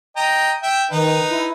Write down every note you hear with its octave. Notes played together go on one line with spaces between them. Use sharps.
D#5 G5 A#5
E5 G5
D#3 D#4 B4
E4